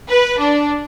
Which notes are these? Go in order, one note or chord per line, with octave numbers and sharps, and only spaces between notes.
B4
D4